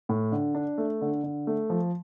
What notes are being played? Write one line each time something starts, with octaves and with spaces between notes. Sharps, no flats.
A2
D3
D4
A3
D3
D3
A3
F3